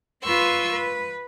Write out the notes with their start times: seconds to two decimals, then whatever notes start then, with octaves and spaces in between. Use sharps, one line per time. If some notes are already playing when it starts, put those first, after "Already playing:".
0.24 F4 B4 C6 C#6 E6
0.72 B4